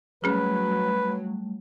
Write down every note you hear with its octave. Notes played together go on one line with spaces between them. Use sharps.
F#3 G3 A3 C#4 G#4 B4